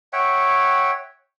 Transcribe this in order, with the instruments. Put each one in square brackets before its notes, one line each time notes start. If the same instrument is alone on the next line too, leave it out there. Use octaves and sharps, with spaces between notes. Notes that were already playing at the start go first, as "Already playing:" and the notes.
[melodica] C#5 E5 F#5 G5